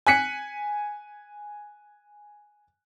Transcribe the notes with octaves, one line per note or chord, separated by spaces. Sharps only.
G#5 F#6 B6 C#7